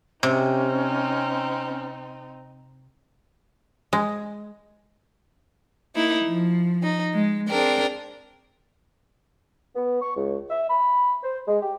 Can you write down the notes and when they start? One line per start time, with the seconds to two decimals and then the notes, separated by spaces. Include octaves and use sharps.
0.23 C3 C4 C#4 D#4
3.93 G#3
5.95 A#3 D#4 E4
6.25 F3
6.82 D#4
7.15 G#3
7.48 C4 D4 G#4 A#4 G5
9.76 B3
10.02 C#6
10.16 C#2
10.50 E5
10.69 B5
11.23 C5
11.48 G#3
11.62 G4